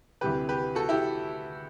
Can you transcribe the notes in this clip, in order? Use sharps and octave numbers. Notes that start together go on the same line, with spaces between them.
D2 C3 E3 G3 G4 B4
G4 B4
F#4 A4
E4 G4